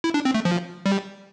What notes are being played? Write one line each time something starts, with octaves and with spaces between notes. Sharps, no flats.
E4
D4
C4
A3
F3
G3